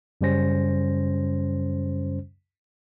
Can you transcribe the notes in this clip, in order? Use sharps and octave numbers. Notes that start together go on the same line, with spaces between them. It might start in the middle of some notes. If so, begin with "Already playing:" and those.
F#2 C#3 G3 C#4 C5 A#6